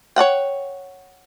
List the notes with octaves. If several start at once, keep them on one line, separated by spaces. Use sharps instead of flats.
C#5 D5 F#5 G5